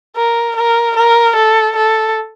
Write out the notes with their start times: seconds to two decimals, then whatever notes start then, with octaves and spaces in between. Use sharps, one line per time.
0.16 A#4
0.56 A#4
0.96 A#4
1.36 A4
1.76 A4